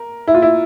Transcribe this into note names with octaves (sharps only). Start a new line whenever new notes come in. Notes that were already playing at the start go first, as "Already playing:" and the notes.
Already playing: A#4
E4
F4
E4